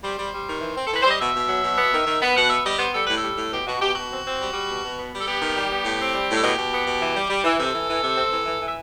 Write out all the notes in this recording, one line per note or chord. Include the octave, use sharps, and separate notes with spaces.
G3 C5
G3
G3
D#3
E3
C4
A4
E3 B4
G3 C5
D#5
B2 E5
B2
F#3
B2
B3
D#3
D#3
B3
B2 F#5
B3 E5
G3 D#5
B3 C5
G3 A4
A2 B4
A4
G3
A2
B2 G4
B2 F#4
B2 G4
B2 F#4
C4
C4
G3
G3
B2
B2
B3
G3
A4
B3 G4
D#3
G3
B3
A2
C4
G3
A2
A4
B2 G4
B2
B3
B2
E3
G3
G3
E3
C3 A4
E3
E3
C3
C4
E3
E3
E3
E5